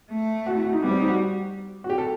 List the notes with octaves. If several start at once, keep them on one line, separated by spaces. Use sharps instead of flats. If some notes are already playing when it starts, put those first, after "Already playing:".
A3
F#4
E4
F#4
D#4
G3 B3
C4
D#4
F#4
F#4
G4
A4